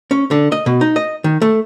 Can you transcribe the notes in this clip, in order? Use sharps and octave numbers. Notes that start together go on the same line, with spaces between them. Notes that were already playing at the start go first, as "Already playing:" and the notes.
C#4
D3
D#5
B2
D#4
D#5
D#3
A3